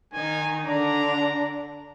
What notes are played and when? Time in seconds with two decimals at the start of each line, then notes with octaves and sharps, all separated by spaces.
0.14 D#3 D#4 G#5
0.65 D3 D4 A#5